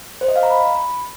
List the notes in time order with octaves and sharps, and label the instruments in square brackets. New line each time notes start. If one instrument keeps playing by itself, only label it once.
[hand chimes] C5
D#5
F5
A#5
B5